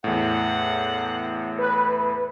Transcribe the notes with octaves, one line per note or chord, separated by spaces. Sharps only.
E2 A2 F#5
B4